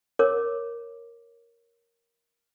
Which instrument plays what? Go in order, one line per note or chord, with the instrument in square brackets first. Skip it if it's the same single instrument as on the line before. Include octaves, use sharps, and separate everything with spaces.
[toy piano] A#4 C#5 D6